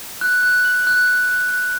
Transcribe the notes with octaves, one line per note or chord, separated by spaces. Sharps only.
F#6
F#6
F#7
F#6
F#6
F#6
F#6